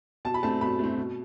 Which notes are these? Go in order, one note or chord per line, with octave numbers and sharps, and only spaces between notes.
B2 A5
B5
A3 C4 A5
B2 B5
A3 C4
B2